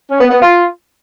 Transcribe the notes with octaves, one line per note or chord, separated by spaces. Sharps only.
C#4
B3
B3
F4